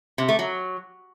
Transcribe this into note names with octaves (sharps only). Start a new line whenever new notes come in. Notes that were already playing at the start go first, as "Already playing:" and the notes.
C3
A3
F#3